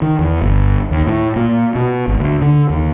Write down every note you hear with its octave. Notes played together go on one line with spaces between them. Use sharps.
D#3
E2
G1
D#2
A2
A#2
B2
G#1
D2
D3
D#2